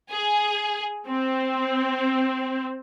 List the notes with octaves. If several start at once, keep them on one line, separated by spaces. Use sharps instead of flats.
G#4
C4